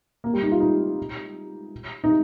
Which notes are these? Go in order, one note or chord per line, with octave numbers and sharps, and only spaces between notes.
A#3
G3
D#4
F4
D#4
D#4